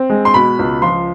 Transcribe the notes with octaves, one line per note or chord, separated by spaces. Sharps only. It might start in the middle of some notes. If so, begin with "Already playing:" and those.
Already playing: C4
G#3
C6
B2 B5
C#2
F3 C6